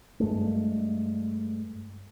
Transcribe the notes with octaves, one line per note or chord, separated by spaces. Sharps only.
G2 G#3 A3